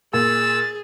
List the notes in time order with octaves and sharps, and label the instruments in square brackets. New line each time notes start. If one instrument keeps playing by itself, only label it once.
[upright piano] A#2 [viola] G#4 [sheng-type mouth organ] E6 [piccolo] A6